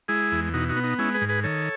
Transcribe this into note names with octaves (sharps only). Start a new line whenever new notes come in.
G#3 E4 G#4
E2
B2 D#4 F#4
D#4 F#4
B3
D#4
G#3 C#4 E4
G#4 B4
G#2
G#4 B4
D#3 A4 C#5